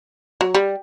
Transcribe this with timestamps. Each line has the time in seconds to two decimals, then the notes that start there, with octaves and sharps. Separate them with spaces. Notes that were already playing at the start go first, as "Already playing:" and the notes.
0.41 F#3
0.54 G3